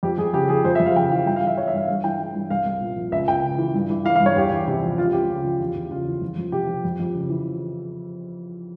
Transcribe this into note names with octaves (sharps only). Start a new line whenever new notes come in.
F2 G4
F2 G#4
C#3 G4
F3 G#4
F2 C5
E5
F2
F5
C#3 G5
E3 F5
G2 G5
F5
E3
E5
E3 C#5
E5
G2 F5
G2 F5
E3 G5
E3
G2
C2 F5
C2
A#2
F3
C#2 E5
C#2 G5
C#3
E3
G2
E3
E3 F5
F5
G2
C#5
E2 G4
E2
C3
F3
C#2 F4
C#2 G4
C#3
F3
E2
E2
C#3 F4
E3
F2
F2
C3 G4
F3
F2
F2
C#3
E3